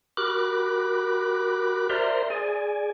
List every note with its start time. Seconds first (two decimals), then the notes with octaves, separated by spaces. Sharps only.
0.17 F#4 G4 A#4 B5 D6 F#6
1.90 A#4 C5 D5 E5 A#5 C6
2.30 G#4 D5 G#5